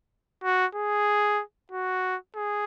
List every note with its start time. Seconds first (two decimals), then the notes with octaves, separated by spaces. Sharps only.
0.44 F#4
0.75 G#4
1.72 F#4
2.36 G#4